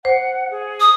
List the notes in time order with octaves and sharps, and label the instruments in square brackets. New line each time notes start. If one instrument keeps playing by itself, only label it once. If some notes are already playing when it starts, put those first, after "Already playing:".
[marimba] C5 [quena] F#5
[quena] G#4
[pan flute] D#6